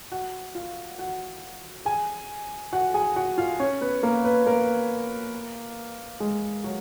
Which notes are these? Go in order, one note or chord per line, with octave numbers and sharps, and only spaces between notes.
F#4 F#5
F4 F5
F#4 F#5
G#4 G#5
F#4 F#5
G#4 G#5
F#4 F#5
F4 F5
C#4 C#5
B3 B4
A#3 A#4
B3 B4
A#3 A#4
G#3 G#4
F#3 F#4